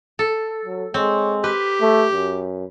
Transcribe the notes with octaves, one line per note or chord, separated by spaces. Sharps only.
A4
F#3
G#3 C4 C#5
G4 B4
A3
F#2